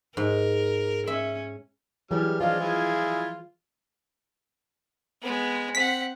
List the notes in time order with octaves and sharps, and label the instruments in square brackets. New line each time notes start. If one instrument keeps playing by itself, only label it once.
[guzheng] G#2 [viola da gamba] A#4
[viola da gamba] C#4 [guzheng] E5
[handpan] E3 F#3 G#4 [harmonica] G3 F6
[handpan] F3 F5 [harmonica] G#3 D4 [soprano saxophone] F4
[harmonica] G#3 E4 G#4
[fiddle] G#3 B3
[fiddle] C4 F#5 [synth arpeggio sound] B6